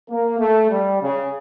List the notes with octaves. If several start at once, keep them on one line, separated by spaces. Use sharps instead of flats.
A#3
A3
G3
C#3